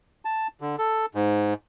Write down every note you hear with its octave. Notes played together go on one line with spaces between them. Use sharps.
A5
D3
A4
G#2